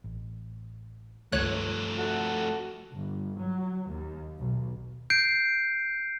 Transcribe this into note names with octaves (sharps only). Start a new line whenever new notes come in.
A1
C#2 G2 D#3 F3 A3 C#5 F#6
F#4 A4
G1
F#3
D#2
B1
G6 C7 D7